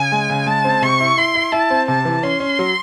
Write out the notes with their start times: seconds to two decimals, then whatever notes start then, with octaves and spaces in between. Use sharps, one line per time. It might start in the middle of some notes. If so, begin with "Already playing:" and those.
Already playing: C#3 G#5
0.12 G#3
0.29 C#3
0.46 G#3 A5
0.64 C4
0.82 C3 C#6
1.00 E4
1.17 E4 C6
1.35 E4
1.52 E4 A5
1.70 C4
1.88 C3 A5
2.05 E3
2.23 C#4 C6
2.40 C#4
2.59 F#3